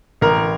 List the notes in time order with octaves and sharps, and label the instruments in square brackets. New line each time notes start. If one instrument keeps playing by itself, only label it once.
[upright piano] A1 A#4